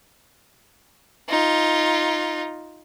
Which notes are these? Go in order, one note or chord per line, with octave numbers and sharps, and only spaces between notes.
D#4 F4